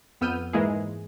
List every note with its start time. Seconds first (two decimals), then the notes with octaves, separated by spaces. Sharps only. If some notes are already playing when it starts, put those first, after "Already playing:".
0.21 F2 B3 E6 F6 G6 D#7
0.53 G#2 E3 G#3 A#3 E4 G#4